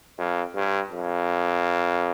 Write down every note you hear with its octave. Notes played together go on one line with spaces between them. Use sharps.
F2
G2
F2